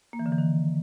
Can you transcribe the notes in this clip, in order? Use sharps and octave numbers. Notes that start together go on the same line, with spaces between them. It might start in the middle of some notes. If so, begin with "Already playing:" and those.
A#3
E3
D3
E3
D#3